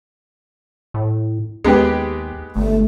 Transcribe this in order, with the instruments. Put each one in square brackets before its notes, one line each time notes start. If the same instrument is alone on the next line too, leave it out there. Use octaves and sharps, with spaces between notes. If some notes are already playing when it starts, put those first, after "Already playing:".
[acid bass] A2
[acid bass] D#2 [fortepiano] G#3 B3 G4
[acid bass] G1 [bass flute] A3